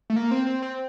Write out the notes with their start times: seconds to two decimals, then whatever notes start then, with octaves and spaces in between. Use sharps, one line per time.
0.10 A3
0.16 A#3
0.31 C4
0.47 C4
0.62 C4